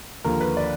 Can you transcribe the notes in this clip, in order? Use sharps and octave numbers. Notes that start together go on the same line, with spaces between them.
D#2 D3 F3 A#4
B4
D5